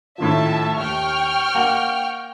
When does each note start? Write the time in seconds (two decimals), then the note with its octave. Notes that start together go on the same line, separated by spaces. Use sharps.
0.18 A2 D#3 F3 E5 A5
0.76 D#2 G5 C#6 F6
1.55 A#3 F#5 F7